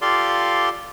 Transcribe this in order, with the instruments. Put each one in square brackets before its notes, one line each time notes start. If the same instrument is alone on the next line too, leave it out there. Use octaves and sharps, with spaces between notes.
[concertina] F4 G4 A4 D5 F5 C6